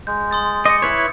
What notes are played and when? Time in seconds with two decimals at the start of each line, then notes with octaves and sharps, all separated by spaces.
0.07 G#3 G6
0.31 C6 D#6 A6
0.65 D#5 D6 C#7
0.82 E4 B4 C#5